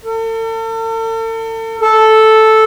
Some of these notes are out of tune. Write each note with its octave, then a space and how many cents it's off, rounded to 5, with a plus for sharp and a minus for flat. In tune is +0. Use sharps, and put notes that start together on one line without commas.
A4 +40
A4 -5